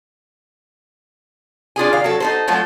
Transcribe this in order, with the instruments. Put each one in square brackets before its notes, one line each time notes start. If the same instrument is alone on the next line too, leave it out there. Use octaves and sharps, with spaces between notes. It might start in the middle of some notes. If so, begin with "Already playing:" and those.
[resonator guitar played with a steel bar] D4 F4 G#4 G#5
D#3 F5
F#3 F#4 A4
D#4 A4 C5
F3 F#3 A3 F4